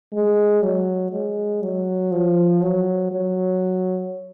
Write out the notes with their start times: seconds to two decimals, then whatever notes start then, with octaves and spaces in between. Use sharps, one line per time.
0.13 G#3
0.62 F#3
1.12 G#3
1.62 F#3
2.12 F3
2.61 F#3
3.11 F#3